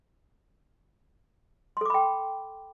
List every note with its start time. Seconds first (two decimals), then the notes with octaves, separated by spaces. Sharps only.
1.77 C6
1.81 A4
1.86 D6
1.90 B5
1.94 G5